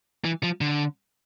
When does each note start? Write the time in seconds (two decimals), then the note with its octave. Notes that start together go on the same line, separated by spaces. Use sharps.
0.25 E3
0.43 F3
0.61 D3